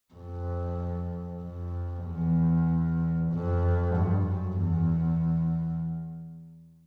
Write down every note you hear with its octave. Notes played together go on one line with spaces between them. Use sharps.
F2
F2
E2
F2
G2
F#2
E2